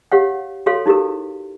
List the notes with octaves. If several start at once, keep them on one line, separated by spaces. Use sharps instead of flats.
G4 C#5 F5 F#5
F#4 A4 C#5 F5 C6
D#4 E4 G4 A4 A#4